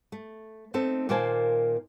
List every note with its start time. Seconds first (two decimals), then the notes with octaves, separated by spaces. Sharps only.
0.12 A3
0.74 A3 C4 D#4 A4
1.09 A#2 D#3 A#3 C5 G#5 A5